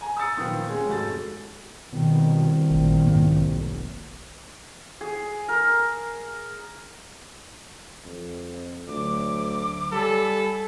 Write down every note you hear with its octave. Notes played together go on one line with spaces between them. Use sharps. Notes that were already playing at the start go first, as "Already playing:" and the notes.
G#5 A#5
D#6 E6 A6 C#7
A#2 D#3 F3 B3
G#3 C#4 G#4
F1 G#2 F#4 A4 A6
C2 B2 D#3
A1 A#2
F1 B1 G#2 A#3
G#4
A#4
F2
D2 D3 F#3 D6
G3 A4 F#5 G#5 B5